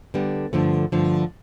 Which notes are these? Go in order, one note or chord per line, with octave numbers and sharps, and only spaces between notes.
D3 G3 B3
G2 D3 F3 A3
G2 D3 F3 A3